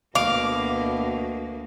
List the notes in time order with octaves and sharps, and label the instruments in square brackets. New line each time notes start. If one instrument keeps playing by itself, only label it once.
[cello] D2 A#3 [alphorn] B2 [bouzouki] F5 [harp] D6